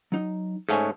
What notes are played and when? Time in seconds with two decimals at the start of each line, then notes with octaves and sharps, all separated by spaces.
0.12 F#3 D#4
0.69 G#2 A3 C#4 A4 F5 G#5